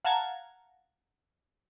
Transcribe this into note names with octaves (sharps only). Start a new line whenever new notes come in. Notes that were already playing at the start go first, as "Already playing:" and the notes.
F5 F#5 A5 A#5 G#6 A6